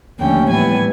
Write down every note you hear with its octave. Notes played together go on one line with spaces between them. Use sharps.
D#2 D3 F3 A3 C#4 G5
A2 E3 G3 B3 G#5